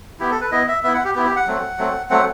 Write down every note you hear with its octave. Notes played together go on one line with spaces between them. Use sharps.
B3 E4 G4
A4
B4
B3 E4 D#5
E5
B3 E4 E5
F#5
G4
B3 E4 G4
G4
F#5
F#3 A3 C4
F#3 A3 C4
F#3 A3 C4 F#5